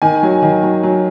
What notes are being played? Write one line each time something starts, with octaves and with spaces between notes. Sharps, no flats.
D#3 G#5
F#3
D#3
F#3
F#3